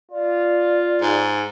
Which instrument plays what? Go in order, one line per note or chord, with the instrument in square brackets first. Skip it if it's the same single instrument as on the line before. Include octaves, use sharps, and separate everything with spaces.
[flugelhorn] F4 [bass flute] D5
[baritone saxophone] G#2